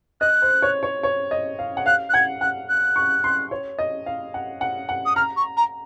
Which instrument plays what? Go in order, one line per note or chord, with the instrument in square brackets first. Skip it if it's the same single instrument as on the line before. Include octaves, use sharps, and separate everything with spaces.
[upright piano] D#5 [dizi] F#6
[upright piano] C5
C#5
C#5
C#5
D#5
F5
F#5
[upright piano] F5 [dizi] F#6
[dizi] F#6
[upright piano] F#5 [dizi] G#6
[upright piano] F#5 [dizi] F#6
[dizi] F#6
[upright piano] C#6
C6
C#5
D#5
F5
F#5
F#5
F#5
[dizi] D#6
[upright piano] A#5 [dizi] F6
[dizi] C#6
A#5